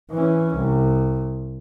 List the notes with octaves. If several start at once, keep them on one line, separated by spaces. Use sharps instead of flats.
E3 C#4
C2